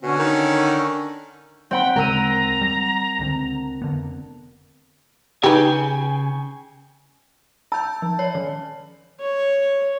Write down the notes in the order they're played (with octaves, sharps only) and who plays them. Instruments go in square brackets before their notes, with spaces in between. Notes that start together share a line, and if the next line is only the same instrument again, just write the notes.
[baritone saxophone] B2 [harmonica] D3 C#4
[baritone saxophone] D#3
[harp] C4 F#5 B5 [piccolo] G5
[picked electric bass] D2 C#3 G#3 [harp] A#4 E6 D#7 [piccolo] A#5
[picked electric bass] G3
C#2 D3 C4
F1 D3 B3
[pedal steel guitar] C#3 G5 [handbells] D#4 G#4 [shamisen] G4 B4 [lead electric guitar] G#5
[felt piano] A5 [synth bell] E6 G6
[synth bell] F3
C#5 D5
D#3
[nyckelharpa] C#5